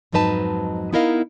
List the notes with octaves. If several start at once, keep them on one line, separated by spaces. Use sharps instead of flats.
F2 G#2 F#3 D#4 B4 A5
B3 D#4 E4 A#4 D#5 F5